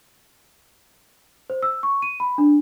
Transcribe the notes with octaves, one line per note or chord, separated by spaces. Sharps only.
C5
E6
C#6
D#7
B5
D4